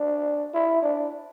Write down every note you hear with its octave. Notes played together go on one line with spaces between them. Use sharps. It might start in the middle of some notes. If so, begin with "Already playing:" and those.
Already playing: D4
E4
D4